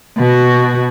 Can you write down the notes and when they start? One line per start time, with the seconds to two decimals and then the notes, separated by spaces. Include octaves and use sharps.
0.17 B2 F#4